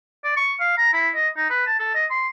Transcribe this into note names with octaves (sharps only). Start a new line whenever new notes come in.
D5
C#6
F5
A#5
E4
D#5
D#4
B4
A5
A4
D#5
C6